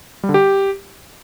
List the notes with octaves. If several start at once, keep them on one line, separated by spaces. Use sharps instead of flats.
G3
D3
G4